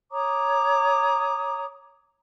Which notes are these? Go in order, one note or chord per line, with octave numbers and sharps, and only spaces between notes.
C#5 A#5 D6 D#6